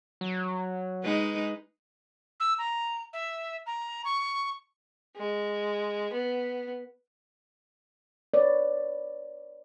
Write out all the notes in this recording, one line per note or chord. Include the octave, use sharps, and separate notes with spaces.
F#3
G#3 D#4 B4
E6
A#5
E5
A#5
C#6
G#3
B3
B4 C#5 D5